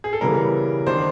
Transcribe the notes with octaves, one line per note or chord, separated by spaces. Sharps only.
G#4
A4
C#3 E3 G3 B3 A#4
D#3 F#3 A#3 D4 C5